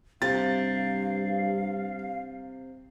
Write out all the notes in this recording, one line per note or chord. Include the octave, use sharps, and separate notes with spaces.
G2 C3 F5 A6